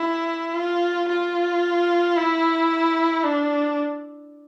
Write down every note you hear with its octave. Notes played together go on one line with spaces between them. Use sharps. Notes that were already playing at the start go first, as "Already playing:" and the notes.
Already playing: E4
F4
F4
E4
D4